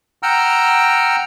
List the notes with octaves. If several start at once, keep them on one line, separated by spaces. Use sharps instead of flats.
F#5 G5 A#5 E6 F6